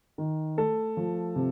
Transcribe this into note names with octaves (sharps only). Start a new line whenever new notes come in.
D#3
A3 A4
F3
C3